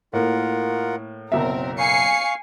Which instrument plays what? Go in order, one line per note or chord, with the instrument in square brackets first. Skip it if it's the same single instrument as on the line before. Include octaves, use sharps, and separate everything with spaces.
[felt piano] A2 A#3 [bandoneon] F4 A#4 F#5
[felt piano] F#1 B1 E5 [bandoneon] C4 [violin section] A#4
[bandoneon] F5 C#6 [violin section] G#5 C7 C#7